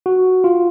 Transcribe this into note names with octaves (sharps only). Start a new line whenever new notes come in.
F#4
F4